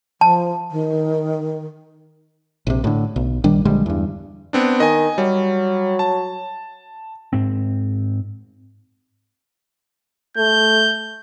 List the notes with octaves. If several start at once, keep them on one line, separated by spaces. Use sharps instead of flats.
F3 A5
D#3
A#1 C3
A2 D3
B1
A#1 D#3 G3 D4
A#1 D3 G3 G#3
E2 G2
B3 C4 D4
D#3 D#5 G#5
F#3 G3
A5
G#2 C4
A3 G6